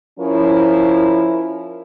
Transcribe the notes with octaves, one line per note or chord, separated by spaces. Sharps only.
F3 C#4 E4 A#4